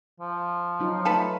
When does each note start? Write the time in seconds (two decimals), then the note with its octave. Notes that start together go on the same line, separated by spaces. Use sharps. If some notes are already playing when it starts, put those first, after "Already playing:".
0.20 F3
0.80 F#3 D#4 F4
1.05 A3 D#4 A4 B4 A5 B5